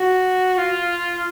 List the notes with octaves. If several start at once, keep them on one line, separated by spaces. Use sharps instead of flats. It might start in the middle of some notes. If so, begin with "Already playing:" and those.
Already playing: F#4
F4